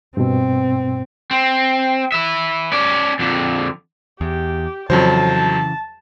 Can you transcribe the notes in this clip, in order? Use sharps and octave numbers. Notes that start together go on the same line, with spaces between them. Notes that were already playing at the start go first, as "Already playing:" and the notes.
G2 B2 C4
C4
B4 E5
C#4 D5
F2 D3
E2 G4
F2 C#3 E3 F#3 C5 A5